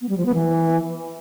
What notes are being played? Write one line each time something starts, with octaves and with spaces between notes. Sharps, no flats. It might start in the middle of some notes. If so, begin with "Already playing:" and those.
B3
G3
F3
B3
E3